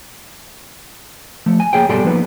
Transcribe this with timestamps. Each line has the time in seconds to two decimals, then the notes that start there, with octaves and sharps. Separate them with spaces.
1.46 F3 A3
1.60 G#5
1.73 A#3 G#4 C#5 G5
1.89 G2 B2 G3 A4 D5 C6
2.04 F3 A#3 B3 D#4 B4